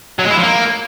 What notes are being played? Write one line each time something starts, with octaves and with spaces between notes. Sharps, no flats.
F#3
G#3
E4
F3
A#3